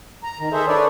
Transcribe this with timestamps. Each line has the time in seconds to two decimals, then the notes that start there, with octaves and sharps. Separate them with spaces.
0.23 A#5
0.39 D#3
0.52 G#4 A4 C5 E5
0.68 D4 A#4 B4 C#5 D5